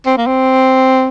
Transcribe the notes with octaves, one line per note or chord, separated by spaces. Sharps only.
C4
A#3
C4